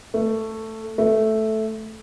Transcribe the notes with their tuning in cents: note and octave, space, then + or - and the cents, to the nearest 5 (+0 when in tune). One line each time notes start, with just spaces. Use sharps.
A3 +10
A3 -5